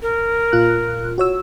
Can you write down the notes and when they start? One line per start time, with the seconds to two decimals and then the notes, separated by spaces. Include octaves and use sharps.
0.02 A#4
0.52 A#2 F4 F#6
1.18 F#4 C#5 E6